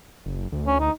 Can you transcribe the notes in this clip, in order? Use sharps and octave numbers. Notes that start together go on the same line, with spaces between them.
F#1
D2
C#4
D#4